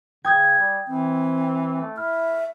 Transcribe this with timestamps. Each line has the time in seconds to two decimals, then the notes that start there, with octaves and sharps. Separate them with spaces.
0.25 C#3 G5 D#6 G6 G#6
0.58 G3
0.88 E3 C4
1.81 A3
1.97 E4 E5 F6